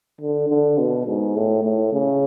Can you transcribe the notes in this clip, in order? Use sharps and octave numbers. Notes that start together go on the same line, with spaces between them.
D3
D3
B2
G#2
A2
A2
C#3